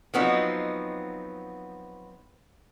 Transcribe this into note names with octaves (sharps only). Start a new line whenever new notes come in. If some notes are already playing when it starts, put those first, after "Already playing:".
F3 F#3 B3 C4 D#4